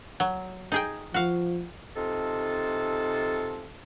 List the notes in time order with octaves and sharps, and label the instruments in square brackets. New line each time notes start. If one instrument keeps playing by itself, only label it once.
[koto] F#3
D#4 G#4 G5
[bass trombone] F3 [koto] F#4 F5
[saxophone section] C3 D#4 F4 A4